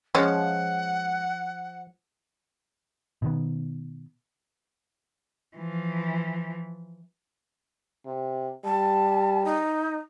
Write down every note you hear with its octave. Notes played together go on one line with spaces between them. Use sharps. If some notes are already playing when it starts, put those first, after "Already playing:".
F3 G#3 C#4 F#5
B2 D#3 B3
E3 F3
C3
G3 A5
D#4